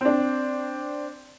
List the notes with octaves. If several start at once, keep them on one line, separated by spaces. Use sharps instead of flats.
C4 D4